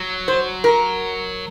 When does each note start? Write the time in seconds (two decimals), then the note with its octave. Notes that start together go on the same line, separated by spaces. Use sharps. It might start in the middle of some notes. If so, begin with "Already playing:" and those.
Already playing: F#3
0.28 C5
0.64 A#4